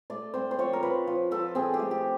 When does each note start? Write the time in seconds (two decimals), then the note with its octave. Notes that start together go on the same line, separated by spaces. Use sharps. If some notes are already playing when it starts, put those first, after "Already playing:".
0.10 A3 D5
0.34 C4 C5
0.51 C5
0.59 F3 C#5
0.73 A#4
0.83 F3 B4
1.07 F3
1.31 F3 A4
1.55 C4 G#4
1.74 G4
1.79 A3
1.91 G4